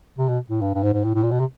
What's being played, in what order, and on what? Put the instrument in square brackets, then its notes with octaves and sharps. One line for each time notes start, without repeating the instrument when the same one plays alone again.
[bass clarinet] C3
B2
A2
G2
G2
G#2
G#2
A2
A2
A#2
B2
C3